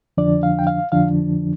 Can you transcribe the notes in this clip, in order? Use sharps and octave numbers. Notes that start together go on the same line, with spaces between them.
F2 D3 F3 D4 D5
F5
G5
F5
F2 D3 F3 D4 F5